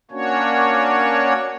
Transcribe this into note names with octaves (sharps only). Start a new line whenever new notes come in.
A#3 C#4 D4 F#4 C#5